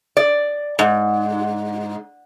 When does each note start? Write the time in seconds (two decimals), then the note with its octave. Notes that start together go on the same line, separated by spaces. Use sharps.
0.17 D5
0.79 G#2